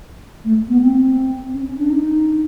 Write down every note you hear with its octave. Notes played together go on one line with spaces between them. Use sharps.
A3
B3
C4
C#4
C#4
D4
D#4